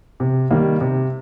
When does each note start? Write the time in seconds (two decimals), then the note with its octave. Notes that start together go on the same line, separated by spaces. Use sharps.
0.20 C3
0.51 D#3 G3 A#3
0.81 C3